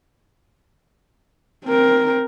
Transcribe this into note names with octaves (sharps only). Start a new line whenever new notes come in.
C4 A#4